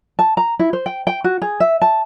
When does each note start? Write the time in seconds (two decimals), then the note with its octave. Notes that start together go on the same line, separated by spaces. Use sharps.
0.19 A5
0.37 A#5
0.59 E4
0.73 C5
0.86 G5
1.07 G5
1.24 F#4
1.42 G#4
1.60 E5
1.82 A5